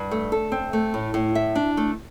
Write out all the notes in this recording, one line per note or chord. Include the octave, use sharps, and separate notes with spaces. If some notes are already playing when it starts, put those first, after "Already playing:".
Already playing: G2
A3
A4
C4
A3
A2
A2
E5
D4
A3